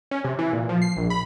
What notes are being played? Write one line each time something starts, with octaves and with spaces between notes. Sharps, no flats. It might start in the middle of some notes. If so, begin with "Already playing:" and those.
C#4
C3
E3
A#2
F3
C7
A#1
B5